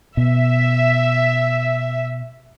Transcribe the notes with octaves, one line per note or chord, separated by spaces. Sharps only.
B2 E5